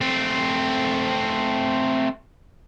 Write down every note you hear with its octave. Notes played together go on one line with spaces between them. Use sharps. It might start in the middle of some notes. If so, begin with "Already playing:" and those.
A3 C4